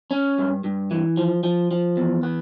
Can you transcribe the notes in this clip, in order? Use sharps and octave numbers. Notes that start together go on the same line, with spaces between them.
C#4
G2
G2
E3
F3
F3
F3
E2
B3